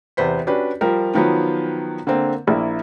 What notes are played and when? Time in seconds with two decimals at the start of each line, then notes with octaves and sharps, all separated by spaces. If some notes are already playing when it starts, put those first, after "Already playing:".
0.17 E2 C3 B4 C5 B6
0.47 C#4 D4 F#4 G4 B4
0.81 F3 G3 A#4
1.15 D#3 F3 F#3 B3
2.07 D3 A#3 C4
2.47 A#1 A#3 E4